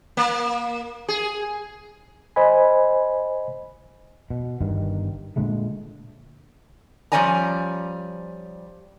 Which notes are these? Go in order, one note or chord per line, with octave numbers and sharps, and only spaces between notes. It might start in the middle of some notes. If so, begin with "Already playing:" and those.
A#3
G#4
C5 D#5 G#5 B5
B2
G1 G2 D#3
A#2 D3 G#3 A3
F3 G3 C#4 D5 G#5 A#5